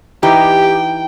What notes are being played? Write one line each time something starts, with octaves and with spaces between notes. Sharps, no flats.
E3 D#4 G4 G5